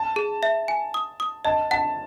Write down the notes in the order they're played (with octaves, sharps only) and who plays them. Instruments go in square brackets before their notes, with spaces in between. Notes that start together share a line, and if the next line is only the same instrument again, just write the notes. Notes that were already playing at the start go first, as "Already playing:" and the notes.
Already playing: [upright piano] A5
[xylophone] G#4
E5
G#5
D#6
D#6
[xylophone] D#5 [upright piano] A5
[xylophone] F#5 [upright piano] A5